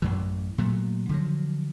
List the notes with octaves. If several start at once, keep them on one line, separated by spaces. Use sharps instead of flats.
A1 F#2 E3
A#2 F#3 A3
D3 F3 F#3